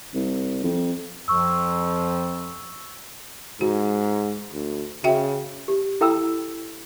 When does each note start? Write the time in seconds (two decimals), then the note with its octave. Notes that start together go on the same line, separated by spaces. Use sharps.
0.14 C2
0.64 F2
1.28 F2 F3 C#6 E6
3.61 G#2 F#4
4.53 D2
5.04 C#3 F#4 E5 G5
5.68 G4
6.01 E4 A4 G5 A#5 B5 E6